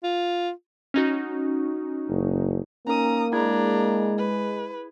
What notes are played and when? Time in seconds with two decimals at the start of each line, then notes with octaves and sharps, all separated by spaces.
0.03 F4
0.94 C#4 D#4 F#4
2.09 F#1
2.87 A#3 C#4 D#4 A#4 A#5 D#6
3.33 G#3 D4 E4 G#4 A#5 G#6
4.18 B4